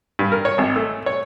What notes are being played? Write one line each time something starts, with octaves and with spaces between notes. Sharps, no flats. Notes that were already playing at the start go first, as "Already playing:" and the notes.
G2
A#4
C#5
G#1
A3
C#5